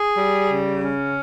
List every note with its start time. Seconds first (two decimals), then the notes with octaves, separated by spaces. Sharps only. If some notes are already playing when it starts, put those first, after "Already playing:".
Already playing: G#4
0.16 G3
0.50 C#3
0.82 C#4